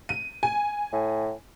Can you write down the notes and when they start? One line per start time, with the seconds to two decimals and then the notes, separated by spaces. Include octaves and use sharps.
0.09 D#7
0.43 G#5
0.93 A2